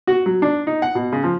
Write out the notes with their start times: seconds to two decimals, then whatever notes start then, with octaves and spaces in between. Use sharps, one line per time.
0.07 F#4
0.26 F#3
0.42 D4
0.67 D#4
0.82 F#5
0.95 B2
1.12 C#3
1.24 F3